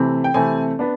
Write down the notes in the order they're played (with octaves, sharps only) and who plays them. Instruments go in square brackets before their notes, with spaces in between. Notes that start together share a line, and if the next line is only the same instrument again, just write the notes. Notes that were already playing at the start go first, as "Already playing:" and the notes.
Already playing: [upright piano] C3 E3 A3 C4
G5
C3 E3 A3 C4 G#5
B3 D4